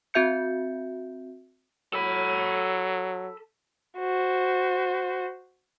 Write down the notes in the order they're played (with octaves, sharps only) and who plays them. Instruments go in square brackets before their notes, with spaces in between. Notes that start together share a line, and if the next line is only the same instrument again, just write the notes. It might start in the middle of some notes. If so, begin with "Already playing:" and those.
[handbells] C4 F#4 E5 G6 C#7
[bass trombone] F#3 [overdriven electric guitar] A4 B5
[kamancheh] F#4 C5